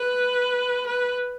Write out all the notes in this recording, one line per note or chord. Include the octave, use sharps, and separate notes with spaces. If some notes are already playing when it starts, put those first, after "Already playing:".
Already playing: B4
B4